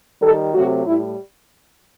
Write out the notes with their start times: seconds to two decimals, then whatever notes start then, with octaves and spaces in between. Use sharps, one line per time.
0.21 D#3 G3 A4
0.53 C3 F#3 A3 F#4
0.86 A2 G3 E4